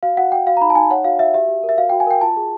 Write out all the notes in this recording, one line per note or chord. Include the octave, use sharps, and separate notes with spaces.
F#4 F5
F#4 F#5
F#4 G5
F#4 F5
A#5
D#4 B5
A5
D#4 G#5
C#5 F#5
F#4 F5
F#4 E5
G4 E5
G4
A#4
E5
F#4 F5
F#4 G5
G#5
A#4 G5
F4 A5
G#4